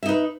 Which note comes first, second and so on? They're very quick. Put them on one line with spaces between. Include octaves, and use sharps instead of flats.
E5 D#4 B4